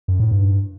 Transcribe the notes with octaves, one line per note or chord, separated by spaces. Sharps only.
F#2
A2
G2